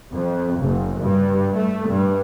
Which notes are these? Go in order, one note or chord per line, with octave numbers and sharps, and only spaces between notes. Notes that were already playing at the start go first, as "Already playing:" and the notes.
F2
F#1
G2
A3
G2